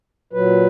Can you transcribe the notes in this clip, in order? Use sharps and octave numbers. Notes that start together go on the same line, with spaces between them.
A#2 F#3 B4